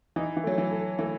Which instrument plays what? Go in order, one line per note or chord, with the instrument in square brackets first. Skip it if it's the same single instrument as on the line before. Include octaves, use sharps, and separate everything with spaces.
[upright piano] E3 [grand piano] D#4
[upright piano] E3
[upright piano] F#3 [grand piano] A3
[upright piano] E3
[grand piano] A4
[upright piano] E3 [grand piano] A3